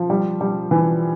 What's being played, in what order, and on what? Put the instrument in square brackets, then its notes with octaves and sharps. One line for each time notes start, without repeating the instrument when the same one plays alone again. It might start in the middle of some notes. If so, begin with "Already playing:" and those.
Already playing: [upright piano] F3
G3
G3
E3